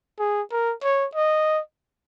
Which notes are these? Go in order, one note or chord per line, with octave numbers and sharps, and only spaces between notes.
G#4
A#4
C#5
D#5